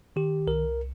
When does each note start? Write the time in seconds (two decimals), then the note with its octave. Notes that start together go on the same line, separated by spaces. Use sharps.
0.16 D#3 G4
0.47 C2 A#4